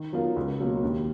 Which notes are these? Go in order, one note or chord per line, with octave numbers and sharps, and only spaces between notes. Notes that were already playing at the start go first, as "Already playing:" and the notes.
Already playing: D#3
F#3 B3 F4 A#4
C#2
B2 F#3 A#3
D#2